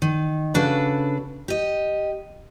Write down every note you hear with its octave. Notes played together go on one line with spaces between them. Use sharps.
D#3
C#3 D4 F#4 A4 B4
G4 D#5